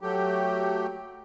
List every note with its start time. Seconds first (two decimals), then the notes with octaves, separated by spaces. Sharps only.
0.01 F#3 A3 G4